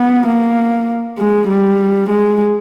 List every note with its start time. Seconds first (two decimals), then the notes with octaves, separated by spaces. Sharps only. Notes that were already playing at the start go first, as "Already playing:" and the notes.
Already playing: B3
0.26 A#3
1.18 G#3
1.48 G3
2.10 G#3